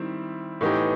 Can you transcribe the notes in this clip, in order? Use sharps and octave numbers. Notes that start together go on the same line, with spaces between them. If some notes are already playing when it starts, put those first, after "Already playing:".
Already playing: D#3 G3 C4 E4
A2 E3 B3 D#4 G4